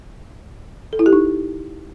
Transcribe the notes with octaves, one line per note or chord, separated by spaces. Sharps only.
A4
E4
G4
D#4